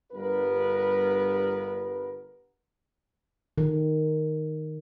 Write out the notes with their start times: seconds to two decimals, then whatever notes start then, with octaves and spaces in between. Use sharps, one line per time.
0.12 G1 G2 B3 A#4 B4
3.58 D#3